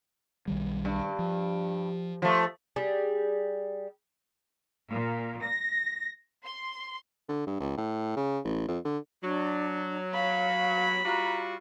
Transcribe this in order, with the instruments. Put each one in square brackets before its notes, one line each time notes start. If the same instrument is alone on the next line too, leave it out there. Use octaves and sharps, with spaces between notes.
[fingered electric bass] B1 D#3 G3
[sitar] G2
[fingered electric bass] F3
[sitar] F3 A3
[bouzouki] G3 G#4
[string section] A#2
A#6
C6
[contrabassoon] D3
G2
C#2
A2
C#3
A1
F2
D3
[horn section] F#3 [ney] D4
[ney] F5 [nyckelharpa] B5
[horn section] G3 F4 F#4 [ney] A#5